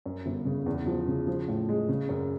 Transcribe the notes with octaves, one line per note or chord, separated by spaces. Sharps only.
F#2
G1
C#3
E2
F3
C#3
F3
A2
G#3
C#3
F#2